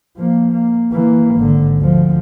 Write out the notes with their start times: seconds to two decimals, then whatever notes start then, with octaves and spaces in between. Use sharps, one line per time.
0.17 F3 A#3
0.52 A#3
0.92 E3 A#3
1.35 G#1 D3
1.78 D2 F3